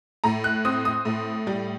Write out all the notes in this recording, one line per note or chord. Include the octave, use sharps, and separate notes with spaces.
A2 A#5
F#6
C4 D#6
D#6
A2
G3